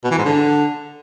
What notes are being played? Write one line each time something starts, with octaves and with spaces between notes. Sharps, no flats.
B2
E3
G#2
D3